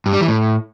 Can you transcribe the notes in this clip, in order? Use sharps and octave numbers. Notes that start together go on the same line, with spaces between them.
G2
G3
E3
A2